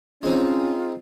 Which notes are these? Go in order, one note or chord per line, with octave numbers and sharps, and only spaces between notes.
G#3 C4 C#4 D#4 F4